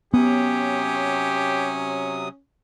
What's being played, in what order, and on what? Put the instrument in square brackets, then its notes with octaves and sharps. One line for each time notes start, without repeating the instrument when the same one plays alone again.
[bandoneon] C3 F#3 D#6 [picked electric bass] B3 [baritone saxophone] C#4 [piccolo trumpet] G4